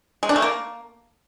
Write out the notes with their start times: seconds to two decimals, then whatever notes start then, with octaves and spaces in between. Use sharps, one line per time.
0.23 G#3
0.29 D4
0.36 A3
0.42 A#3